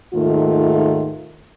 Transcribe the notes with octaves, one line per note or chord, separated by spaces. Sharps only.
D#2 G#2 D#3 A3 F4